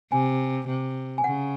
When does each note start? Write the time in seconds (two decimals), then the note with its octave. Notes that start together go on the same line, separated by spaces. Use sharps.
0.12 C3 G#5
0.68 C3
1.18 G#5
1.24 C#3 F#5